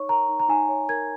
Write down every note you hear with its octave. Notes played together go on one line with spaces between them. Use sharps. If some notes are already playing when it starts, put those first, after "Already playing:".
Already playing: D#4 C#5 C#6
A#4 A#5
D#4
A#5
D#4 G#5
C#5
A#4 G#6